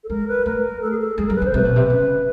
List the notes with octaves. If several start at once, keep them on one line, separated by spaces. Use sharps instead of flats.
A4
G#3 A#4
B4
A3 A#4
A4
G#4
A4
G#3 G#4
G3 A#4
B4
D3
C5
C3 B4
B2
C3
C#3